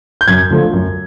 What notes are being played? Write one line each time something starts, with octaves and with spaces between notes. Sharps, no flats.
G6
F#2 G#6
D3 F3 A3
F#2